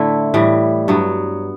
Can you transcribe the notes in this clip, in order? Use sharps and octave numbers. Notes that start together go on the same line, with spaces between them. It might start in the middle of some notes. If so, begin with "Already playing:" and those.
Already playing: A2 D3 A3 E4
A2 E3 G3
G2 F#3 B3